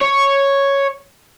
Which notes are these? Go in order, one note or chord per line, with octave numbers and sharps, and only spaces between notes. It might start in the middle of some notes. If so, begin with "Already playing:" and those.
C#5